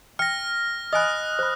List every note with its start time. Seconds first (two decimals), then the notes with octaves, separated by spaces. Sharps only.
0.19 G5 F6 A#6
0.93 D#5 G#5 B5 D#6 F#6
1.39 C5 B5